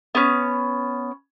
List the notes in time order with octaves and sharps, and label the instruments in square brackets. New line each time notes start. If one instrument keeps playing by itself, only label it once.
[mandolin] B3 C#4